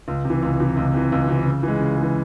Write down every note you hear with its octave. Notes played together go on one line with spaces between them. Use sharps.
C#2
C3 E3
C#2
C3 E3
C#2
C3 E3
C#2
C3 E3
C#3
E3 G#3
C#3
G#3
E3